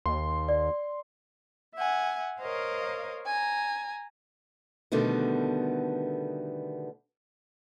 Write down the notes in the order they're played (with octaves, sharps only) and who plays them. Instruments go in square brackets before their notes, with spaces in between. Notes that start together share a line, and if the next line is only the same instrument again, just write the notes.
[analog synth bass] D#2 [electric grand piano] C6
[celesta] D5
[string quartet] E5 F#5 G#5
A#4 C5 C#5 D#5 F5
G#5 A#5
[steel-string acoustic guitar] B2 D3 D#3 G3 A3 B3